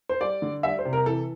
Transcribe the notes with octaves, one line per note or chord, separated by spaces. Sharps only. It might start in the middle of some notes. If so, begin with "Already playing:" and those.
C5
G3 D5
D3
G3 E5
C5
C3
A#4
E3 A4